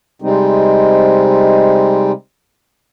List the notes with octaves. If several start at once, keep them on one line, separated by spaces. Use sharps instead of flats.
C3 G3 G#3 C4 D#4